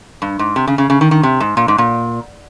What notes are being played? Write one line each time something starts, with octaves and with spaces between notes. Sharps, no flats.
G2
G#2
C3
C#3
C#3
C#3
D#3
D#3
C3
G#2
A#2
G#2
A#2